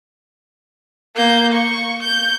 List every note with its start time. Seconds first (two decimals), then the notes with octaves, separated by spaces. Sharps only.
1.16 A#3 G6
1.53 C#6
2.03 G6